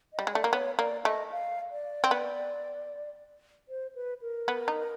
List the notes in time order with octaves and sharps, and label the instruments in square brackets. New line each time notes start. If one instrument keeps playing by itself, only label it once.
[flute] D#5
[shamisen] G3
G#3
[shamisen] A3 [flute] D5
[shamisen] A#3
[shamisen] B3 [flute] C#5
[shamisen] A#3 [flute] D5
[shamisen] A3 [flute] D#5
[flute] F5
D5
[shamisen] C4
B3
[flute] C5
B4
A#4
[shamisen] B3
D#4